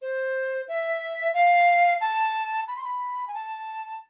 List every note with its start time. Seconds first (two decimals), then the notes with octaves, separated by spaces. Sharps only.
0.02 C5
0.68 E5
1.34 F5
2.01 A5
2.68 B5
2.76 C6
2.84 B5
3.28 G#5
3.34 A5